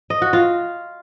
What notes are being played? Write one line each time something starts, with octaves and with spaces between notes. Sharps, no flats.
D#5
F#4
F4